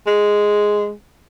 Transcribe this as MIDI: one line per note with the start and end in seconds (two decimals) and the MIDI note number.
0.07 0.92 56